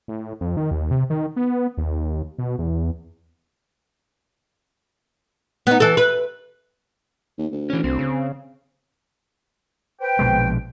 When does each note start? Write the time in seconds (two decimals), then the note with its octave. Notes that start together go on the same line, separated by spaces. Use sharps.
0.08 A2
0.41 F2
0.57 D#3
0.71 D#2
0.91 C3
1.10 D#3
1.36 B3
1.77 D#2
2.38 B2
2.58 E2
5.67 B3 D#4
5.80 E3 A4
5.97 B4
7.38 D#2
7.52 D2
7.70 E3 C#4
7.84 C2 C4
7.99 C#3
10.01 B4 C5 G5
10.19 A#1 B2 G#3